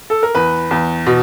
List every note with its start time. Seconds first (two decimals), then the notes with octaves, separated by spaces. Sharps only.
0.10 A4
0.23 A#4
0.35 E2 B4
0.71 E2
1.07 B2